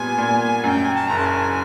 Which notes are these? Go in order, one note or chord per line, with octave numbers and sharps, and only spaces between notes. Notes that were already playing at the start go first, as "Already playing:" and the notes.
Already playing: A#2 G3 B3 G#5
A#2
F#2 G5 G#5
G#5
A5
F#1 A#5
A5
G#5